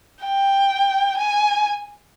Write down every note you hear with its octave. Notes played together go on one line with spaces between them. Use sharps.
G5
G#5